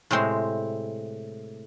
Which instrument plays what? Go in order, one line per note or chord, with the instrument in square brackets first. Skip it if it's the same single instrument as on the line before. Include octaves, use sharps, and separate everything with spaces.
[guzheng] A2 C3 G#3 C4